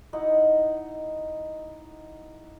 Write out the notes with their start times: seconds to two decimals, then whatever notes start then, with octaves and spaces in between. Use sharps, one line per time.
0.13 D#4 E4 D#5 F#5